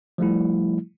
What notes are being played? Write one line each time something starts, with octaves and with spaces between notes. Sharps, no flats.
F3 G3 A3 E4